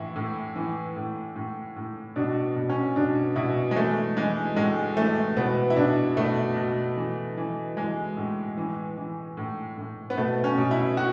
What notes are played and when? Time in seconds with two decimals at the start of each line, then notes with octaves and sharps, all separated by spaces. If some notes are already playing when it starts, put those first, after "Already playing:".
Already playing: A2 E3 E4
0.16 A2
0.56 E3
0.96 A2
1.36 A2
1.76 A2
2.16 B2 D4
2.56 B2
2.69 C#4
2.96 B2 D4
3.36 B2 E4
3.71 G#3
3.76 E3 A3
4.16 E3 G#3
4.56 A2 G#3
4.96 E3 A3
5.37 B2 B3
5.70 E4
5.77 B2 D4
6.17 B2 A3
6.57 B2
6.97 E3
7.37 E3
7.77 E3 G#3
8.17 A2
8.57 E3
8.97 E3
9.37 A2
9.77 A2
10.10 B3
10.17 B2 A3
10.44 C#4
10.57 B2
10.71 E4
10.97 F#4